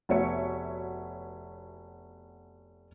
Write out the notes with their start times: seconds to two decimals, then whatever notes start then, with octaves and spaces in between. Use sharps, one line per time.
0.09 F1 B3 F#4 C#5 E5 C#7